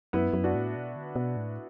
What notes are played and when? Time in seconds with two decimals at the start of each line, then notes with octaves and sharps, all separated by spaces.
0.13 F#2 B3 E4
0.33 F#2
0.44 D4 F#4
0.55 A2
0.76 B2
0.96 D3
1.16 B2
1.37 A2